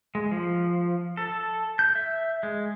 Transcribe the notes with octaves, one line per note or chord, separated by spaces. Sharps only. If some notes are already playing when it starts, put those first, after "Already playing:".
G#3
F3
A4
G6
E5
G#3